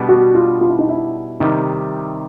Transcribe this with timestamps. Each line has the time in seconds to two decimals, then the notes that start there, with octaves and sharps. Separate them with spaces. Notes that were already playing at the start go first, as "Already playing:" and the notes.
Already playing: B2 G3 B3 D4
0.09 F#4
0.35 F4
0.61 F4
0.70 E4
0.79 D#4
0.89 E4
1.40 C3 D#3 G3 D#4